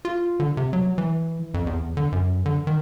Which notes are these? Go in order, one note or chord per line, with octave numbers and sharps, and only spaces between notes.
F4
D3
C3
F#3
E3
F2
E2
D3
F#2
D3
D#3